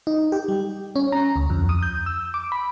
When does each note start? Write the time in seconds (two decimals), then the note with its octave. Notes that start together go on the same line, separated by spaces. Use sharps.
0.07 D#4
0.32 G4
0.48 G3
0.96 C#4
1.12 A#5
1.36 D2
1.50 F2
1.69 D#6
1.83 G6
2.06 E6
2.34 D6
2.52 B5